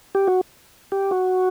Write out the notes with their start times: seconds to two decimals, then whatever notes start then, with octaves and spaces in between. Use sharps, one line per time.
0.15 G4
0.28 F#4
0.92 G4
1.11 F#4